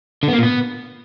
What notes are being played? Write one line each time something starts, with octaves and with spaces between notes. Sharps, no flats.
D3
B3
A#3
A#2
B3